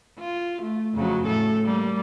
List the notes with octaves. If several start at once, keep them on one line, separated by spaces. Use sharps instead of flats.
F4
A3
F2 C#3 F#3
A2 A4
G3 A#3